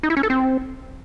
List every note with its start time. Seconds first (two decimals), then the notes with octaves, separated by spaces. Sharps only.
0.03 D#4
0.10 E4
0.17 C#4
0.23 A4
0.30 C4